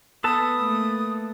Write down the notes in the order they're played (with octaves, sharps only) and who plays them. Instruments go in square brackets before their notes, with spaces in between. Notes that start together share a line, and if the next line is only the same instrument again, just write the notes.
[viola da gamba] B3 [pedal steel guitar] A4 B4 A5 [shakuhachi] D#6
[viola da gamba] A3 A#3